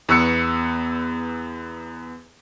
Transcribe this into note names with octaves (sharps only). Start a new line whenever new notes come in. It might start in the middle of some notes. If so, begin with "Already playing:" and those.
E2 B3 C#6 E6 F#6 C#7